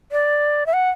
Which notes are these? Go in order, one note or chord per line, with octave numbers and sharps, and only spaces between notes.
D5
E5
F#5